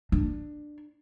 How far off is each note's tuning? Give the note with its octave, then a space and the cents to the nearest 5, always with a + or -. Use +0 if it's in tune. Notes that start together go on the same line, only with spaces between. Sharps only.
D4 +15